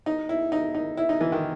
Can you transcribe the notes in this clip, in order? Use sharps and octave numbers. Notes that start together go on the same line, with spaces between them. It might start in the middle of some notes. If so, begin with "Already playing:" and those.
D#4
E4
D#4
D#4
E4
D#4
E3
D#3